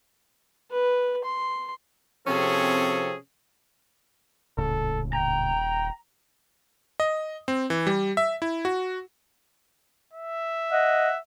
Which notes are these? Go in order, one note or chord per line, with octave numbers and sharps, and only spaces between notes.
B4
C6
C3 F3 C4 C#4 G#4 A4
D#1 C#2 A2 C#3 A4
G5 A#5
D#5
C4
E3
G3
E5
E4
F#4
E5
D#5 F#5